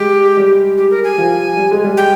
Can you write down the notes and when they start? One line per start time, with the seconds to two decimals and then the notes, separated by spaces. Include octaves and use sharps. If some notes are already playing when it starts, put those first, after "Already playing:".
Already playing: G#3 G4
0.37 G3
0.78 G4
0.91 A#4
1.04 G#5
1.18 F3
1.57 G3
1.71 G#3
1.84 G3
1.97 G5